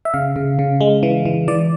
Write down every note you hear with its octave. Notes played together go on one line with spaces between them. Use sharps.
E5
C#3 F5
C#3
C#3
G#3
E3
E3
E3 D5